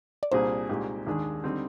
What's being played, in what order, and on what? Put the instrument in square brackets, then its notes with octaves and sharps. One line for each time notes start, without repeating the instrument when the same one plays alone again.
[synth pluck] D5
[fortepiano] C2 A#2 G3 D4 G#4 [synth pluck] C5
[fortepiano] C2 A#2 G#3 D#4 G4
D#2 D#3 G#3 D4 G#4
D3 G3 C4 D#4